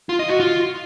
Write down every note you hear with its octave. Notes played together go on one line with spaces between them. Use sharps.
F4
D#5
F#4
F4